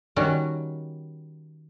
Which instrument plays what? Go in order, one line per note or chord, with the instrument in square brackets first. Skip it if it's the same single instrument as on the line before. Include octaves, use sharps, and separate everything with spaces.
[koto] D#3 G3 C#4 F#4